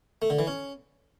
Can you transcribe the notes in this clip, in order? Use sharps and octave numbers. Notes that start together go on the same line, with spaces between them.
A3
D3
E3
C#4